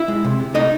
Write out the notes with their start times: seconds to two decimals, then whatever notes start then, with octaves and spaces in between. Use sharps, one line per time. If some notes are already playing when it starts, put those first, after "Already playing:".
Already playing: E4 E5
0.08 G#3
0.24 C3
0.40 C3
0.54 A3 D#4 D#5